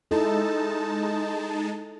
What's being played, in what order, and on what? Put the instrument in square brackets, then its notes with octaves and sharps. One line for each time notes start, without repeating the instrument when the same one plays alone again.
[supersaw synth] G#3 D#4 A5 [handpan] E4 A4